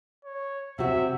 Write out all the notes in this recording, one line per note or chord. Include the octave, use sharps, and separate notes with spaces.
C#5
C3 F#4 E5